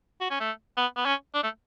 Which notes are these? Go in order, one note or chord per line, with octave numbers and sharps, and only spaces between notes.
F#4
C#4
A3
B3
B3
C#4
D4
A3